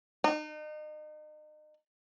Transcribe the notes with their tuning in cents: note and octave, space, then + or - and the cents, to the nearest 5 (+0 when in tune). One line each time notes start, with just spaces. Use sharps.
D#4 -35